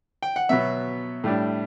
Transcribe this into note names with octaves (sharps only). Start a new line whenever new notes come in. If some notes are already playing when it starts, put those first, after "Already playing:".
G5
F#5
B2 F#3 B3 E5
A2 G3 D4